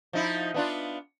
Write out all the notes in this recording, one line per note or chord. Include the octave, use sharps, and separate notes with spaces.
F3 D#4 E4
B3 D4 F4